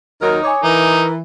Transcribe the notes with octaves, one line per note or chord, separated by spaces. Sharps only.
D#2 F#3 D#4 A#4
C#5 G#5 D6 D#6
E3 D#4 A#4